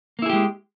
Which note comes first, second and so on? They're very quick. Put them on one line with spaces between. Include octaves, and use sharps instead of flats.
A#3 E4 G#4 G4 G#3